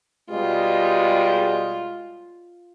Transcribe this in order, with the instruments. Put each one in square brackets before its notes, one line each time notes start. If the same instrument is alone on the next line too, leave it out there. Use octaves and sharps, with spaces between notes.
[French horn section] B2 G3 G#3 [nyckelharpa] F4